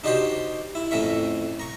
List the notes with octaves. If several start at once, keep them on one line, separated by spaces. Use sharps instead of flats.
D4 D#4 F#4 G4 C5 C#5
E4
F2 A2 C#4 A#4 E5 C#6
A#5 C#6